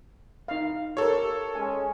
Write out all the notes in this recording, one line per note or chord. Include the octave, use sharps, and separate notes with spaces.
D#4 F5
G4 A4 A#4 C#5
G#3 C#4 G#5